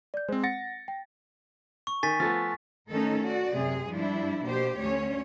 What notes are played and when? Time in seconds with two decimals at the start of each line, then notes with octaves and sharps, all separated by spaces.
0.14 D5 G6
0.29 G#3 C4 C5
0.44 F#5 A6 A#6 C#7
0.88 G5
1.87 C#6
2.03 D#3 G#5 A6 B6
2.20 F3 A3 B3
2.90 D#3 A3 C#4 D#4 A4 A#4
3.21 F#4 D5
3.54 F#2 C3 G#4
3.90 G2 F3 G3 D4 E4
4.44 B2 A#3 G4 C5
4.78 D2 D3 C#4 C#5